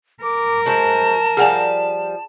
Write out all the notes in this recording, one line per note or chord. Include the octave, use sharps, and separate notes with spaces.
A#4 D6
G#3 F#4 C5 A5
F3 G3 G#4 F5 F#5 G#5